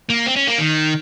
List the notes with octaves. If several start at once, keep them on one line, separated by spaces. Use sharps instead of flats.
A#3
C4
C#4
A#3
D#3